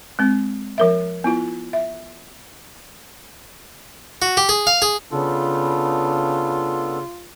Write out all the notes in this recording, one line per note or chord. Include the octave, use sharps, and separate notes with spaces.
G#3 C4
F3 A#4 E5
B3 E4 F4
E5
F#4
G4
G#4
F5
G#4
C#3 B3 D4 F4 A4